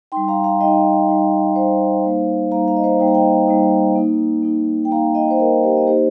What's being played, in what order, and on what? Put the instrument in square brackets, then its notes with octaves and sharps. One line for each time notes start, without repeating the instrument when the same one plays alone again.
[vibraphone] G3 D#4 G5 C6
F5 A#5
F5 A#5
G3 D#4 D#5 G5
G3 D#4
G3 D#4 C5 F5
G3 A#3 D#4
G3 A#3 D#4 F5 A#5
F5 A#5
D#5
C5 F5
G3 A#3 D#4 G5
A#5
D#5 G5
G3 A#3 D#4
A#3 D#4
A#3 D#4
G5
A#3 D#4 F5 A#5
D#5 G5
C5
A#3 D#4 A#4 D#5
G4 C5
D#5
A#3 D#4 G4 C5